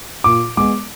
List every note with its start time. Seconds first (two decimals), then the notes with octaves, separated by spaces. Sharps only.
0.24 A#2 D6
0.57 G#3 B3 D6